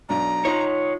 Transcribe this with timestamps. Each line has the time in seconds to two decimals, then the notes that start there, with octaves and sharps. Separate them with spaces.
0.09 B1 B2 D4 A#5
0.45 D#4 F4 C#5